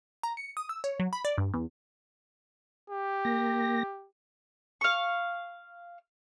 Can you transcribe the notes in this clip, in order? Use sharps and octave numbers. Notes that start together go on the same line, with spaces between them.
A#5
C#7
D#6
E6
C#5
F#3
B5
D5
G2
E2
G4
A#3 A#6
F5 C#6